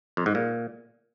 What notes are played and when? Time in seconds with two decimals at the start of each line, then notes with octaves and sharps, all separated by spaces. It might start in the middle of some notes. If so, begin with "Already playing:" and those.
0.17 F2
0.26 G#2
0.35 A#2